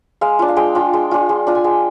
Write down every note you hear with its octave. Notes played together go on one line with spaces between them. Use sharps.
G#3 F5
D4 F4
F5
G#3 G5
D4 F4
G#3
D4 F4
G#3
D4 F4
G#5
G#3 G5